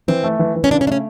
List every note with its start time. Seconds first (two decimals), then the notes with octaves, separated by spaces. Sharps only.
0.08 E3 C4
0.24 A3
0.39 E3
0.56 E3
0.64 C#4
0.71 C#3 D4
0.81 C#4
0.86 A3 D4
0.92 C#4